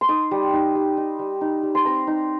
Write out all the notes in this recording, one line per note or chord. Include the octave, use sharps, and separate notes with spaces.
C6
D#4 D#6
G3
D#4
G3
D#4
G3
D#4
G3
C6
C4 A#5
D#4